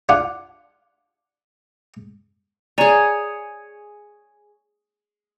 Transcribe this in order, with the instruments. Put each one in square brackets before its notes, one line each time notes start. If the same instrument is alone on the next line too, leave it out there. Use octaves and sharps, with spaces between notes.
[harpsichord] D4 F4 F#5
[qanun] G#4 C#5 [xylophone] D5 G#5 A#5